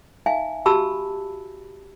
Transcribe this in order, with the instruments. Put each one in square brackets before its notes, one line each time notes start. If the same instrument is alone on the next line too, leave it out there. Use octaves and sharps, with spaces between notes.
[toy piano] D#4 E5 F5 G#5
F#4 G4 A5 B5 E6